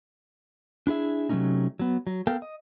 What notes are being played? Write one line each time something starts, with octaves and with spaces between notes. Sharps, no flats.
D4 E4 G#4 E5
C3 F#3 G3 A3 C#4 D#4
F#3 B3
F#3
B3 A4 A#4 F5 G5
D#5